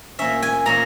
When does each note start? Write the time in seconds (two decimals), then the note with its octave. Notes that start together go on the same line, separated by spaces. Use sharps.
0.19 A#2 A#3 C#4 E5
0.42 G#5
0.66 A#2 A#3 C#4 A#5